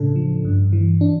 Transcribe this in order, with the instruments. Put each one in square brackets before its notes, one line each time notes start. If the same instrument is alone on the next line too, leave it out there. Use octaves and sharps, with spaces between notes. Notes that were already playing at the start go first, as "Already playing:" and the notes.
Already playing: [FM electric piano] A2 C#3 D4 A4
F3
G2
E3
D4